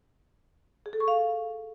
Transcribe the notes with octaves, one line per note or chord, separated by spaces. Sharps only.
G#4
A4
C#6
F5